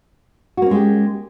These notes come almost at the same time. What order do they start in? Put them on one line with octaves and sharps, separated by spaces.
F#4 A#3 C#4 G#3 G4